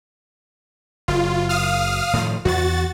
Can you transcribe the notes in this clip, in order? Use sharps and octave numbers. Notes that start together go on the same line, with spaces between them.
F#1 F4
F5 D#6 F6
A2 D#3 F3
E2 F#4 A6